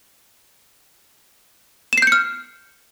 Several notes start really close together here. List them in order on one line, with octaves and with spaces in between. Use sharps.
E7 C7 G6 C#7 F6